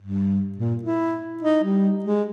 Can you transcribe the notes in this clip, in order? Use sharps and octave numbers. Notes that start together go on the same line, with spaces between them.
G2
A#2
E4
D#4
G3
G#3